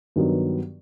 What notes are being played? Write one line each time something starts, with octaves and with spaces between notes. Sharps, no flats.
G2 D#3 F#3 B3